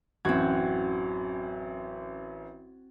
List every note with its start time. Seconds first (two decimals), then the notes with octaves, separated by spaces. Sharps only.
0.25 A1 F#2 C4 F#4 G#6